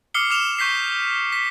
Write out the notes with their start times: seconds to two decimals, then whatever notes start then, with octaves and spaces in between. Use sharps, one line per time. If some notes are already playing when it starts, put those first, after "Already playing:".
0.14 D6 D#6 F6 C7 C#7 G7
0.30 D6 F6 E7 F7 G7
0.59 C#6 G6 B6 C7
1.32 B6